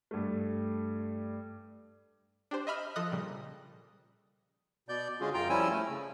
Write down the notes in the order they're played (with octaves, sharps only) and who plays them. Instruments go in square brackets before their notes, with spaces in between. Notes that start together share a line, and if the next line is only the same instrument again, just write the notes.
[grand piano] G2 A3
[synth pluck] D4 G4 C5
D#5 E5 B5 F6
F3 A4 D#5 D#6 F#6
A#2 C#3 G3
[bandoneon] B2 D5 G6
D3 G#3 C#4 F4 F#4 G#4
F#2 F4 G5 A#5 G6
F3 G3 C#4 E4 G#5 E6
A3
C#3